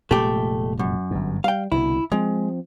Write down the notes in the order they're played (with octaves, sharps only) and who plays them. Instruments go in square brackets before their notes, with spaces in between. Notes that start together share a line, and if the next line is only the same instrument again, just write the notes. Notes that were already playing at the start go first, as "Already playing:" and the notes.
[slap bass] F1 A#2 G#3 [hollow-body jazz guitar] A3 G4
[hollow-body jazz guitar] F#2
[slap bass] G1 G2
[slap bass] G3 [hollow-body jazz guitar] F5 G5
[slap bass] C2 B2 D3 [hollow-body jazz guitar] E4
[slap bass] F3 C4 [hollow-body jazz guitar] G#3